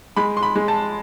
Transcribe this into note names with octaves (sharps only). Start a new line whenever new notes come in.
G#3 B5
C6
B5
G#3
A5